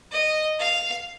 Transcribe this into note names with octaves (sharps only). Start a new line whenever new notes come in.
D#5
F5